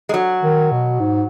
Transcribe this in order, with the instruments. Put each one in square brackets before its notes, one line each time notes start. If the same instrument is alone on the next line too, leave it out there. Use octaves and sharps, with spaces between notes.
[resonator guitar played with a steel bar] G#3
F#3
[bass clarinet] D#3
B2
G#2